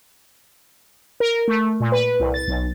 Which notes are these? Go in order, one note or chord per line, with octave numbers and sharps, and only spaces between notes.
A#4
A3
A#2
B4
C2
A6
B1